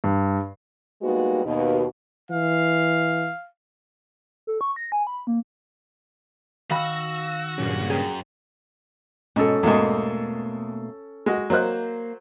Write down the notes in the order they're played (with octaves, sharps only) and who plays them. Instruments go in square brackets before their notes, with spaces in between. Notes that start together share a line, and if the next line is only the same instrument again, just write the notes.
[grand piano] G2
[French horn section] G3 G#3 A#3 B3 D#4 F#4
D#2 B2
[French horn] E3 [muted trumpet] F5
[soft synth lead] A4
C#6
A#6
G#5
B5
A#3
[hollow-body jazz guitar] D#3 B5 [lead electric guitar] F#4 [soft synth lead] F5 [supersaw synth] E6 A#6
[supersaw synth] G2 A#2 C#3 [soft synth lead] F#3
[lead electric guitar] F#2 [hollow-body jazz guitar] G#4 [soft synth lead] G5
[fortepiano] G#2 [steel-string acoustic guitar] B2 C#5 [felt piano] C#4 A4
[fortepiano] E2 G#2 [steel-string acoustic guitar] B2 A3 A#3
[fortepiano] G#3 F#4
[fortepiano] F#3 C5 F#6 [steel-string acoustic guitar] A#3